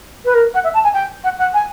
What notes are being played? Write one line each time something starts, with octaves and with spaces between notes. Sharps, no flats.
B4
A#4
F#5
E5
A5
G#5
G5
F#5
F#5
G#5